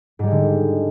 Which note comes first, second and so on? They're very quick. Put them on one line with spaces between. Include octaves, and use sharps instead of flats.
G#2 G3 G#3 D3